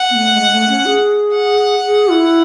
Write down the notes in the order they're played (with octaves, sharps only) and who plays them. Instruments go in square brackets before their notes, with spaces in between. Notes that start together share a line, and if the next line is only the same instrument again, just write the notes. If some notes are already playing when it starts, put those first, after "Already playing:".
Already playing: [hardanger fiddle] F#5
[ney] B3
A3
G#3
A3
C#4
G#4
[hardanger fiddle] F#5
[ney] G#4
E4